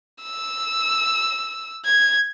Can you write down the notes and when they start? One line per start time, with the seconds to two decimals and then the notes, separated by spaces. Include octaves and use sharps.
0.24 E6
1.85 G#6